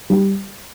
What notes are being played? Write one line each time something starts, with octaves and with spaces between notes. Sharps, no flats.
G3